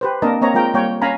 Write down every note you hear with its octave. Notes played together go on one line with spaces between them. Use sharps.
G4 B4 C5
A#3 C4 D4 A#4 D#5 A5
A#3 C4 C#5 D#5 A#5
G#3 F4 A#4 G5 A#5
G3 A#3 C#5 G5
C#4 F5 G#5 A#5 B5